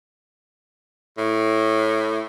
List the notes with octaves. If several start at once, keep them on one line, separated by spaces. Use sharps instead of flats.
A2